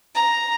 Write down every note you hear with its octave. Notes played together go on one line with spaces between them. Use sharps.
A#5